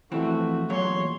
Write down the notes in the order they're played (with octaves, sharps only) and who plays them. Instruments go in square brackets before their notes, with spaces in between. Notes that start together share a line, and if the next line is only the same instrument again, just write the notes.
[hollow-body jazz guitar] F2 E3 C4 [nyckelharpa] A3 F#4
[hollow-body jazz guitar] E2 A#2 F#3 [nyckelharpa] C#5 C6